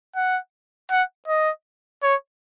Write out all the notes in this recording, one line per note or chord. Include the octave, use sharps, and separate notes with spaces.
F#5
F#5
D#5
C#5